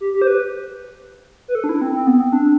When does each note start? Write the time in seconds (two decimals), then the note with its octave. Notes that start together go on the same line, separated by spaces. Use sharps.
0.01 G4
0.14 G4
0.22 C5
0.27 B4
1.48 B4
1.55 A4
1.64 D4
1.69 E4
1.82 C4
1.94 C4
2.07 B3
2.20 C4
2.33 D4